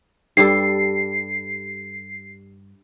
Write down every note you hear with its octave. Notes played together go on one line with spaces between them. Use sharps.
G2 G3 A4 C7